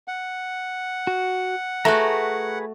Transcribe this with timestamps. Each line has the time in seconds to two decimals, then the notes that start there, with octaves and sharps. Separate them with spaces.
0.08 F#5
1.07 F#4
1.85 A3 F#4 G#4 B4 A#5